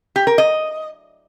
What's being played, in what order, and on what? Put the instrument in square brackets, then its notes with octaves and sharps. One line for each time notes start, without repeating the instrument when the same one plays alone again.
[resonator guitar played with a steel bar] G4
A#4
D#5